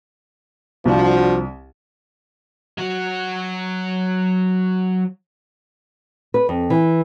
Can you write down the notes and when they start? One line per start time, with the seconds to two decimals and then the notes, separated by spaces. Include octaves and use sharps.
0.85 C2 F3 D4 F#4
2.78 F#3 F#4
6.34 B4
6.49 F2
6.70 E3